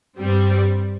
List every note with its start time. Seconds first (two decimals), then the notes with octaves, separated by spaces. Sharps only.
0.16 G2 G3 C4